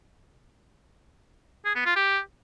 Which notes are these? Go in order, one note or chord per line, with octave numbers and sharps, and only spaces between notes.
G#4
B3
F4
G4